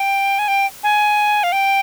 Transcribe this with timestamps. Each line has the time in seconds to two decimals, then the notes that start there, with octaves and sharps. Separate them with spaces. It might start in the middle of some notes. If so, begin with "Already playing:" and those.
Already playing: G5
0.39 G#5
0.48 G5
0.83 G#5
1.43 F5
1.52 G5